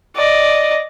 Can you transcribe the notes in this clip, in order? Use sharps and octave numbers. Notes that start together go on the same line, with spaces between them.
D5 D#5